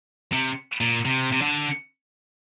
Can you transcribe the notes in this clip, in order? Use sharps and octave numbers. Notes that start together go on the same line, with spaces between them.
C3
A#2
C3
C3
D3